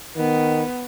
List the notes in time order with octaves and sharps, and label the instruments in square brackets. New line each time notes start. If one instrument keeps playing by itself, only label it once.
[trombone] D#3 [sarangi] B3